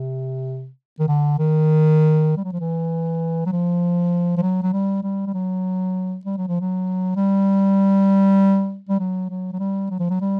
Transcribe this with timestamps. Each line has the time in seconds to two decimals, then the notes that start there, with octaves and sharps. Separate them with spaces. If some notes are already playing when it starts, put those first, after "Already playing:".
Already playing: C3
1.00 D#3
1.08 D3
1.39 D#3
2.37 G3
2.45 F#3
2.53 F3
2.60 E3
3.46 F#3
3.52 F3
4.37 F3
4.42 F#3
4.62 F#3
4.73 G3
5.03 G3
5.26 G3
5.34 F#3
6.25 G3
6.37 F#3
6.48 F3
6.61 F#3
7.16 G3
8.89 G3
8.99 F#3
9.30 F#3
9.53 F#3
9.60 G3
9.91 F#3
10.00 F3
10.10 F#3
10.21 G3